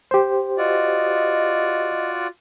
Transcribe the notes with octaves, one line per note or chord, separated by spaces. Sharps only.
G4 C5
F4 F#4 D5 D#5